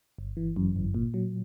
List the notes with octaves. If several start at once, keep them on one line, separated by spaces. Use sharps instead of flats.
G1
E3
F#2
G1
A#2
F#3